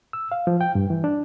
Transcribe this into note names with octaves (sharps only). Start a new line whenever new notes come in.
E6
F5
F3
G5
G2
E3
D4